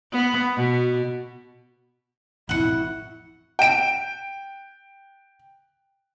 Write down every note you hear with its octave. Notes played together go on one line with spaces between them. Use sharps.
B3
B2
A1 F2 B2 E4 F#5 C#6
G5 D7